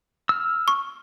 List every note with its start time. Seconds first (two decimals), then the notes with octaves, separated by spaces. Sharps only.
0.29 E6 F6
0.68 C#6